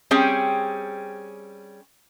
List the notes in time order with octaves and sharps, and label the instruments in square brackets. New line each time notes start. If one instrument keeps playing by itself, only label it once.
[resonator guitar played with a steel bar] G3 C4 C#4 G#4 G5